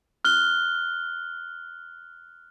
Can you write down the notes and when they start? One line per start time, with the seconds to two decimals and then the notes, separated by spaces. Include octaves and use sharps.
0.25 F6 F#6 G7